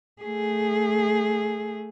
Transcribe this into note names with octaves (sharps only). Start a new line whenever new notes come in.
A3 G#4